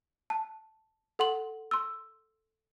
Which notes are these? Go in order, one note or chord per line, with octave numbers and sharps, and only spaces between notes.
A5
A4 F#5 C6 F#7
C6 E6